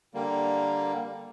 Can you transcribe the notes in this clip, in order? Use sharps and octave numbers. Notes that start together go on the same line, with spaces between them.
D3 G3 A#3